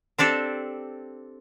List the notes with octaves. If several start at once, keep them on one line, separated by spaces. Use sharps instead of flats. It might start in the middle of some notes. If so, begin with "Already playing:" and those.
C4 D4 G4 A4